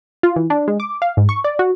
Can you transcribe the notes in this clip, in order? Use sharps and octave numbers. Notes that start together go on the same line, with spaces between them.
F4
E3
D4
G#3
D6
F5
G#2
C#6
D5
F#4